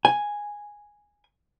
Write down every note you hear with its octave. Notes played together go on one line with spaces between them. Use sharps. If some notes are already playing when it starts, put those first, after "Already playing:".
G#5